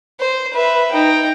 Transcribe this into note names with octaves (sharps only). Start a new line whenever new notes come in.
C5
B4 E5
D#4 G5